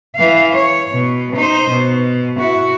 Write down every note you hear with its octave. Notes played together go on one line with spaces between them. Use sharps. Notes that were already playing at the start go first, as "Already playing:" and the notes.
E3 F5
C#5
B2
D#4 C5
B2
E4 F#4